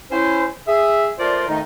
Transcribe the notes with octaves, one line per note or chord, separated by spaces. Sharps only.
C#4 E4 C5
G#4 E5
A3 F4 A#4 C5 D5
F2 D#3 A3 D#4